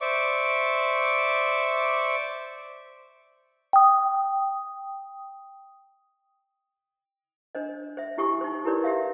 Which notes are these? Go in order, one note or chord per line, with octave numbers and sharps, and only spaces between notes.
C5 D5 E5 C#6 D6
G5 D#6
D4 C5 D#5
C5 E5
E4 F#4 G4 G#5 C#6 D#6
D#4 C5
E4 G4 A#4 B4 C#5 D5
G4 C#5 E5 F5